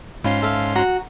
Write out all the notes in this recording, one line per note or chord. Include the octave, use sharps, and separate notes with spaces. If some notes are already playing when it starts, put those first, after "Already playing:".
G#2 C#4 F4 B5 C6
A4 E5 F5
F#4 A#5